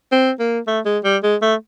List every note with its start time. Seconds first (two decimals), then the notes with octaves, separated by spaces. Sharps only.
0.12 C4
0.40 A#3
0.67 A3
0.86 G#3
1.05 G3
1.23 G#3
1.42 A3